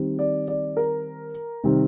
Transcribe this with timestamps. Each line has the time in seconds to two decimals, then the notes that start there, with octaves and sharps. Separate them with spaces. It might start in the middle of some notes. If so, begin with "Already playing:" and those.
Already playing: D#3 G3 C4
0.19 D5
0.48 D5
0.77 A#4
1.64 C3 D#3 G3 C4